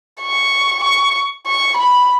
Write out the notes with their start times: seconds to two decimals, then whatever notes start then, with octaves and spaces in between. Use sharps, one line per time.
0.22 C#6
0.83 C#6
1.47 C#6
1.77 B5